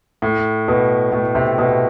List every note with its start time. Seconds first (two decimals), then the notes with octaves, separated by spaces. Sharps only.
0.22 A2
0.68 B2
1.12 A2
1.35 C3
1.58 B2